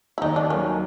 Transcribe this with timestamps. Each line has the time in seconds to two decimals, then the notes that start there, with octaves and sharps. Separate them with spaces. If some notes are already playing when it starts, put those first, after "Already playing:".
0.18 E4
0.21 D#2 D#4
0.36 D4
0.50 D#3 F#3 A#3 C#4